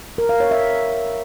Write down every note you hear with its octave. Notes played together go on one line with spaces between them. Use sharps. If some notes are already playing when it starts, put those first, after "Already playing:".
A#4
F5
C#5
E5